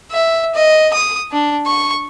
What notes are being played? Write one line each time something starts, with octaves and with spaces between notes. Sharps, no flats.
E5
D#5
D#6
D4
C#6